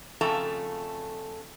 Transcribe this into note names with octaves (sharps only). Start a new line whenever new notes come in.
F2 C#3 A3 A4 E5 A#5